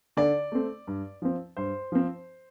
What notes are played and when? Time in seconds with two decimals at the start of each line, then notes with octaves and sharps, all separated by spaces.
0.17 D3 D5
0.52 A3 C4
0.87 G2
1.22 F3 C4
1.57 G2 C5
1.92 F3 C4